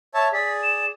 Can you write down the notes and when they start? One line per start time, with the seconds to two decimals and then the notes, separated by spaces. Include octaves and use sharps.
0.14 C#5 E5 A5
0.32 G#4 D5 B6
0.62 E7